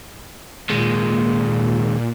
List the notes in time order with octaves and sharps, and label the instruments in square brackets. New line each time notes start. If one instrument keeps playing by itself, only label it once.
[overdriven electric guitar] D#2 G#3 [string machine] A#2